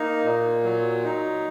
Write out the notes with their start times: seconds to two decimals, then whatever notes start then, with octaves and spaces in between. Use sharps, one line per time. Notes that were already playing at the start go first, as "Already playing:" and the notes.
Already playing: A#3 D#4
0.24 A#2
0.64 F#3
1.04 D#4